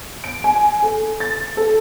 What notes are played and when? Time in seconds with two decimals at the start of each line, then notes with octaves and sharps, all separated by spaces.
0.24 D7
0.44 G#5
0.83 A4
1.20 A6
1.57 A4